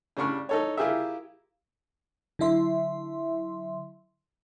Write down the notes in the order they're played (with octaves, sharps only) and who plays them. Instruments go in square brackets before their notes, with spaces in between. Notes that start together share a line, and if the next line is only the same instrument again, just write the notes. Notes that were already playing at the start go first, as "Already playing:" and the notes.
[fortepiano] C#3 G3 D4 C#6 F6
D#4 A4 C#5
E4 F4 G4 G#4 A#4 E5
[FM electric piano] D3 F#3 E4 E5 C6